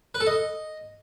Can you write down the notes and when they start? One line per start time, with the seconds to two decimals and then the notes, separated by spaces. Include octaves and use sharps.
0.15 B4
0.20 A4
0.26 D#5